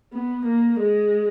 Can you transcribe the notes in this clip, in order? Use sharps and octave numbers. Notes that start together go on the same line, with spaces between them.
B3
A#3
G#3